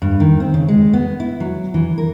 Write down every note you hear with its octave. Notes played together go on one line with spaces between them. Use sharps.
G2
D#3
C4
C#3
G#3
B3
E4
F#3
E3
A#4